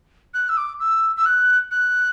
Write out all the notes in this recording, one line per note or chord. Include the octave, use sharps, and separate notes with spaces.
F#6
E6
D6
E6
E6
F#6
F#6